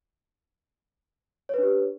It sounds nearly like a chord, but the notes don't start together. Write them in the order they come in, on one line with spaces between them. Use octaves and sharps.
C#5 B4 D4 G4